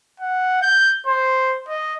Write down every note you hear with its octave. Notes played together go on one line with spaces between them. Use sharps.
F#5
G6
C5
D#5